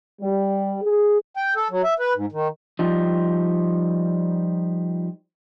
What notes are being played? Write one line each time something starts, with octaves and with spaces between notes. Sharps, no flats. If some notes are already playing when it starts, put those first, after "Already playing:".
G3
G#4
G5
A4
F#3
E5
B4
G#2
D#3
F3 G3 D#4